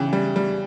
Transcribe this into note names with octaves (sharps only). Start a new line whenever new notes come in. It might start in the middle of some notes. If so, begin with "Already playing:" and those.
Already playing: C#3 E3 G5
G3
G3